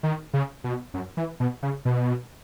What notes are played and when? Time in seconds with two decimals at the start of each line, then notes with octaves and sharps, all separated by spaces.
0.03 D#3
0.34 C#3
0.64 B2
0.94 F#2
1.17 E3
1.40 B2
1.63 C#3
1.85 B2